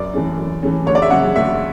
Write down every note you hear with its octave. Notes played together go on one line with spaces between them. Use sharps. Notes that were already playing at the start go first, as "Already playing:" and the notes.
Already playing: F#2 D5
E3 A3 C#4
F#2
E3 A3 C#4
D2 C#5
D5
E5
C#3 F#3 C#4 F#5
D2 E5